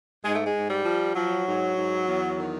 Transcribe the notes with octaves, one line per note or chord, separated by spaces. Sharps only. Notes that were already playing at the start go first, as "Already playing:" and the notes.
G#2 G#3
A3
G#3
G#2
G3
F3
F3 F#3
G#2
G#2
E2
D#3